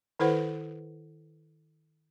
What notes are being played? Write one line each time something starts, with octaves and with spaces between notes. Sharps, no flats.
D#3 E4 A4 B4 C5 F#5